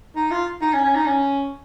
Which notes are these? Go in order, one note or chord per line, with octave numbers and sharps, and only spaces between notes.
D#4
F4
D#4
C#4
C#4
D#4
C#4